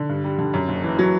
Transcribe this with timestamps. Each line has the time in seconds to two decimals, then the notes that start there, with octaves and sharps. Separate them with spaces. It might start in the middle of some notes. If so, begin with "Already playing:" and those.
Already playing: D3
0.09 G2
0.24 G3
0.39 D3
0.54 F#2
0.68 F#1
0.84 E3
0.99 F#3